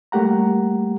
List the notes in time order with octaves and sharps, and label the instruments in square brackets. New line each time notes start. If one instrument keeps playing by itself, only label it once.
[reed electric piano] G3 A3 A#3 G4 F#5 A#5